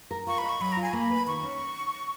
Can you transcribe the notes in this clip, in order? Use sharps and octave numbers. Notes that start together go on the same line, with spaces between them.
A#4
F4 C#6
B5
D#5
C#6
F#3 B5
F4 A#5
G#5
A#3 B5
B4
D#3 C#6
C#4